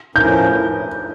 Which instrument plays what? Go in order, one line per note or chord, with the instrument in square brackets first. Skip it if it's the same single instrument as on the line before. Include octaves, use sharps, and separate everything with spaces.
[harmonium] A2 F3 C#4 E4 A#4 [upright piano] G6